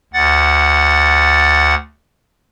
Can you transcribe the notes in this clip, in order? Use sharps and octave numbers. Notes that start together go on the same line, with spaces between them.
D2 F#5 A6